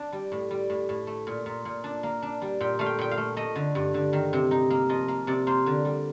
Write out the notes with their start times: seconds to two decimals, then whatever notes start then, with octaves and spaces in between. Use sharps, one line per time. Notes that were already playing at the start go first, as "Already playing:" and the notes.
Already playing: D4
0.13 G3
0.32 A2
0.51 G3
0.70 A2
0.89 A2
1.07 A3
1.27 A#2
1.46 A#2
1.65 A#2
1.84 D4
2.03 A#3
2.22 D4
2.42 G3
2.61 A#2 G5
2.79 A3 F5
2.86 G5
2.99 A#2 G5
3.11 F5
3.17 A3
3.37 A3 D#5
3.56 D3
3.75 G2
3.94 D3
4.13 D#3
4.33 C3
4.51 D#4
4.70 A#3
4.89 F3 D#5
5.08 A#3
5.27 C3 D5
5.47 A#3 C5
5.66 D3
5.85 G3